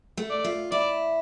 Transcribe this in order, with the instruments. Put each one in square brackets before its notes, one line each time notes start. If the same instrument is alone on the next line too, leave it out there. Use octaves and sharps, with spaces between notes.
[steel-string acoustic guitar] A3
[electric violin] D5
[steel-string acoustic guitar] F4
[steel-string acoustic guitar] E4 [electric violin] D5